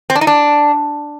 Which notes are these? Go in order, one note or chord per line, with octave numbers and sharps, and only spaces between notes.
C4
D4
D#4
D4